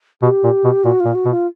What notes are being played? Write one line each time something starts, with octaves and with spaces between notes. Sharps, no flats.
B2 G4
A#2
B2
A#2 F#4
A#2 F4
F#4
B2
F4